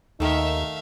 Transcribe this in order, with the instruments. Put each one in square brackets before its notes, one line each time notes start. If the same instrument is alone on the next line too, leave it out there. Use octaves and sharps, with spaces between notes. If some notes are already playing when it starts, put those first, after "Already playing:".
[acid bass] D#2 [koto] D#3 A3 [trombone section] D#4 [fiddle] E5 F5